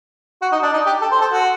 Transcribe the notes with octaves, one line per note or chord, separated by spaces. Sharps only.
F#4
D#4
D4
D#4
G4
A4
C5
A4
F#4